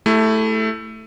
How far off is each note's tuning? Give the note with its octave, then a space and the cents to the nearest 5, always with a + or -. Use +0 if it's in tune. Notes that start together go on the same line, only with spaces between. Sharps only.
A3 +0 E4 +0 G4 +40